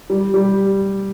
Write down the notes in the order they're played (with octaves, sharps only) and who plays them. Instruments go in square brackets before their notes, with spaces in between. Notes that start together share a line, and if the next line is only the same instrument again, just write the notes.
[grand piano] G3
G3